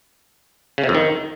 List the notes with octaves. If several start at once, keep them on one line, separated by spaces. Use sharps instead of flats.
C#3
C3
F2
D#3